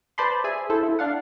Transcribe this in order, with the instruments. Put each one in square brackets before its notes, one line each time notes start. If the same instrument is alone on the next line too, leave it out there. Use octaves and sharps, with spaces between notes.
[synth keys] B4 C5 D5 A5 B5 C6
G#4 E5 G#5
E4 A4 C5
E4
D4 F5 F#5